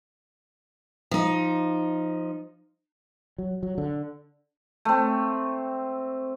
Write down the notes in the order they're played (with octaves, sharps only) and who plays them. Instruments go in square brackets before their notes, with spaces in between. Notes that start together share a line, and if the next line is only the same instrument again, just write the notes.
[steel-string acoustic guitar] F3 D#4
[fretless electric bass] F#3
F#3
D3
[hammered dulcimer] A3 C4